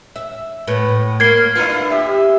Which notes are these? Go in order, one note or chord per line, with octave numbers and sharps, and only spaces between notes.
E5
A2 B3
A#3 G#6 C7 G7
B3 D4 E4 F4
G4 E5